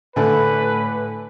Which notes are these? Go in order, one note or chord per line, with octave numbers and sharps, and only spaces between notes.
A2 D3 A3 B4 G#5 B5